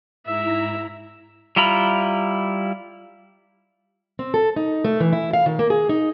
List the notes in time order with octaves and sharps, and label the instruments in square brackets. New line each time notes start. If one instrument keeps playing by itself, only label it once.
[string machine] G#2 E4 A#5 [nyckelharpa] E5
[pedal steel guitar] G3 E4 F4 A#5 B5
[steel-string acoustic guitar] C4
A4
D#4
A3
E3
E4
F5
D#3
A#3
G#4
D#4